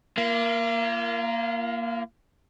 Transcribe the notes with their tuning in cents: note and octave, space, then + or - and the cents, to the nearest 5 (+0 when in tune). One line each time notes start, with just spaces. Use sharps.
A#3 +5 F4 -40